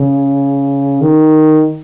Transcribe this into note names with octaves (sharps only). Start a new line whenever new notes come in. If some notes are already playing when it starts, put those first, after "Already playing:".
Already playing: C#3
D#3